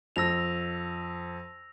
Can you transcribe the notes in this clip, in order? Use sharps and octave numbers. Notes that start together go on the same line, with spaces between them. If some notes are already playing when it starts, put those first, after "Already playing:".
F2 E6 A#6 F7